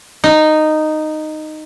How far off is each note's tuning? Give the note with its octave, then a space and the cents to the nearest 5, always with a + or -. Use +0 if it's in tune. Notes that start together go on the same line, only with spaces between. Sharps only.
D#4 -10